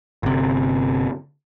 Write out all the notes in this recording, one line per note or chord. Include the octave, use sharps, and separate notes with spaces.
G1 C3